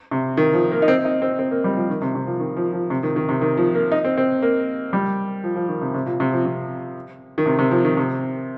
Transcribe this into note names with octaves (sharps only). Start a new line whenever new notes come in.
C3
D#3
F3
A#3
D#4
C4
D#4
C4
C4
A#3
G3
F3
D#3
C3
C3
F3
D#3
F3
F3
C3
D#3
D#3
C3
D#3
F3
A#3
D#4
C4
C4
A#3
G3
F3
F3
D#3
C3
C3
A#2
C3
F3
C3
D#3
C3
C3
F3
D#3
C3